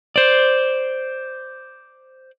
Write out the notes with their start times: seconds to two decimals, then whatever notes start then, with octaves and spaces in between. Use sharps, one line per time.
0.16 C5 D5